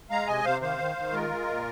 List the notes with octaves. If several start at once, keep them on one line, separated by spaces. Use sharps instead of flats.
G#3 F5 A#5
C3 D#5 G#5
C3 C5 F5
D#3 C5 F5
D#3
D#3
G#3 F4 A#4
G#3
A#2